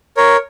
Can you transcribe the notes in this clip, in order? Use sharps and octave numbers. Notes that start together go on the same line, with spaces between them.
A#4 C#5